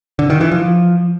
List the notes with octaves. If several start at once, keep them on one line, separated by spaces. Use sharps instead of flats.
D3
D#3
E3
F3